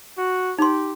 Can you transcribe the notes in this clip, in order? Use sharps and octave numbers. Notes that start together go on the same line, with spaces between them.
F#4
D#4 G4 C6